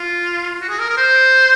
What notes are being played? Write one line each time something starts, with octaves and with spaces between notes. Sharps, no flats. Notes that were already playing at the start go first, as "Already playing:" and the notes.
Already playing: F4
F#4
G#4
A#4
A#4
C5